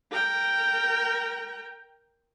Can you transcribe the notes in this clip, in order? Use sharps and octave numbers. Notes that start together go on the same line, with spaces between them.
A#4 G5